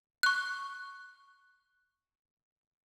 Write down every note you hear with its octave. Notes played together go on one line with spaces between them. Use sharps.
C#6 F#6